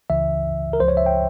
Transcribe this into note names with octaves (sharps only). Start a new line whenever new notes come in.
C#2 C#3 E3 E5
A#4
C#2 C#3 F3 C5
C#5
E5
G5